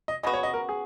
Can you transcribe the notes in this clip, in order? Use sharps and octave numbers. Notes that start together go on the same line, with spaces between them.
D#5
C#3 F#3 B3 F#4 D#5
C#5
D#5
A#4
G#4